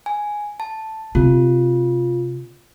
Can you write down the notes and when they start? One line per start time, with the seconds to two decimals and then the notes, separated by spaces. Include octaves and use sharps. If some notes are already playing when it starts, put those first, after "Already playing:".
0.06 G#5
0.60 A5
1.15 C3 C4 F4